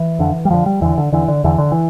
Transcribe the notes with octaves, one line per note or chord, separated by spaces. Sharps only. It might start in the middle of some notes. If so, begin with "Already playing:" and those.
Already playing: E3
F2 D3
G3
F2 D3 F3
G3
E2 D3 E3
D3
E2 D3 E3
D3
E2 D3 E3
D3
E3